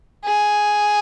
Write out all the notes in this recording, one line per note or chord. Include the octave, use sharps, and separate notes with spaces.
G#4